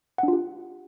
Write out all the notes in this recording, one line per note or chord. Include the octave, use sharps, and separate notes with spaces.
D4 F4 G4 F#5